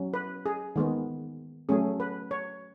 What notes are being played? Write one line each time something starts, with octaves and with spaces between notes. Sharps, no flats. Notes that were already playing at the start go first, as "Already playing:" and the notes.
Already playing: F#3 C#4
B4
G#4
D#3 G#3 B3
F#3 A3 C#4 G#4
B4
C#5